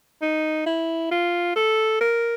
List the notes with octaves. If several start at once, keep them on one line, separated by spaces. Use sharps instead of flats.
D#4
E4
F4
A4
A#4